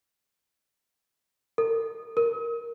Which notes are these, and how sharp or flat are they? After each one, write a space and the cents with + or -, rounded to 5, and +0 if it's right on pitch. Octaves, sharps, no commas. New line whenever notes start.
A#4 -45
A#4 +0